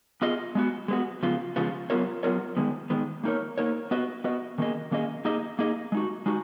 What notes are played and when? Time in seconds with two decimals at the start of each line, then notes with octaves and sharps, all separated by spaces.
0.22 B3 F4 G#4 D#5
0.55 G#3 B3 F#4
0.88 G#3 B3 F#4
1.23 C#3 F3 G#3 B3 F4
1.56 C#3 F3 G#3 B3 F4
1.90 F#3 B3 F4 A#4 C#5
2.23 F#3 B3 F4 A#4 C#5
2.57 D#3 G#3 B3
2.90 D#3 G#3 B3
3.24 A#3 D#4 A#4 C#5
3.58 A#3 D#4 A#4 C#5
3.91 B3 F#4 B4 D#5
4.24 B3 F#4 B4 D#5
4.58 D#3 A#3 C#4 G#4 D#5
4.91 D#3 A#3 C#4 G#4 D#5
5.25 A#3 D#4 G#4 D#5
5.59 A#3 D#4 G#4 D#5
5.92 G#3 D#4 F#4
6.26 G#3 D#4 F#4